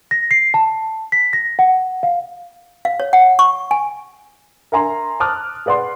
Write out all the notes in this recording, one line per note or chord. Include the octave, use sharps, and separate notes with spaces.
A#6
C7
A5
B6
A#6
F#5
F5
F5
C#5
F#5
C#6
G#5
A#4 E5 G#5 A#5 C6
A5 D6 D#6 F6 F#6
G#4 B4 D5 F#5 C6